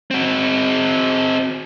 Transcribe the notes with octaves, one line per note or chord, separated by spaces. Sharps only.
C4 F#4